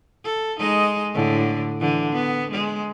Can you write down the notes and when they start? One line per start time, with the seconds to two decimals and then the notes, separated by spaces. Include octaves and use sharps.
0.24 A4
0.59 G#3 D#4 D#5
1.13 A2 D3
1.80 D3 E3
2.13 B3
2.51 G#3